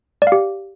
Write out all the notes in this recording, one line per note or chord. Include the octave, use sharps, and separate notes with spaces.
D5
F5
G4